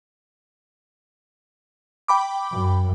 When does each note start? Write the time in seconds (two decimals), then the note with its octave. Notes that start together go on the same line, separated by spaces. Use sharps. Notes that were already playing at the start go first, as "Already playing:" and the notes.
2.08 G5 B5 D6
2.53 F#2